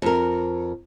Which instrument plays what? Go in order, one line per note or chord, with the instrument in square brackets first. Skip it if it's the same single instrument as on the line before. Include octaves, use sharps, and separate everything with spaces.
[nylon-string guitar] F2 A#4